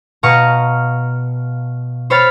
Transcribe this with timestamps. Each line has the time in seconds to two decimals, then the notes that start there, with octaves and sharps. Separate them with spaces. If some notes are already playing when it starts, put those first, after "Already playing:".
0.23 B2 F5 A#5 C#6 D#6
2.10 C5 C#5 B5 F6 A6